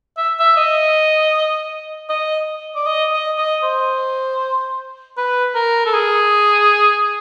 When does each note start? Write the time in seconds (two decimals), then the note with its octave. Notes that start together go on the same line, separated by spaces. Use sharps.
0.17 E5
0.39 E5
0.56 D#5
2.09 D#5
2.75 D5
2.86 D#5
3.13 D#5
3.38 D#5
3.63 C5
5.17 B4
5.55 A#4
5.86 A4
5.94 G#4